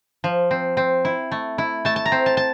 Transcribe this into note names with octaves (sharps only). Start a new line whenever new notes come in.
F3
C4
C4
E4
A3
E4
A3 A5
A5
A#5
C4
A5
A5